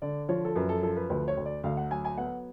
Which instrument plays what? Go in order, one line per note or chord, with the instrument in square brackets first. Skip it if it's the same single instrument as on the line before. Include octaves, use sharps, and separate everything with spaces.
[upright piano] D3 D5
F3 C#5
A4
F#2 B4
A4
F3 A4
B4
D2 B4
C#5
D2
D5
D2 F5
F#5
F#3 G#5
G#5
B3 F#5